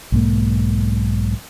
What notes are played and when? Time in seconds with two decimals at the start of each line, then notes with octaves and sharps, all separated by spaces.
0.12 B1 G#2 A#3